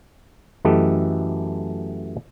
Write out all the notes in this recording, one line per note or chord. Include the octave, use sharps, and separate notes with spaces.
F#2 E3 A3 G4 A4 D#5